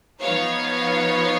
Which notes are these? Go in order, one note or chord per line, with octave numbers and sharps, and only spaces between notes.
F3 B3 D#4 C#5 F5